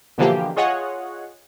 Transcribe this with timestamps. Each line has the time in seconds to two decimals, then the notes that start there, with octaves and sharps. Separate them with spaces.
0.18 B2 D3 E3 F3 A#3 G4
0.56 F4 G#4 C#5 D#5 F#5